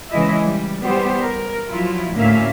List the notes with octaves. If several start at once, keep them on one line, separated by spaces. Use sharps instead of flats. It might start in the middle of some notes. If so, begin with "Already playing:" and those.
C#3 E3 G#3 E4 D#5 E5
G3
E3 G3 B3 G4 C5
A#4
F3 F#3 E4 F4
D2 A2 A#3 C#4 E5 F5